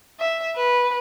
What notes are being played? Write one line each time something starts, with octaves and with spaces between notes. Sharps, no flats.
E5
B4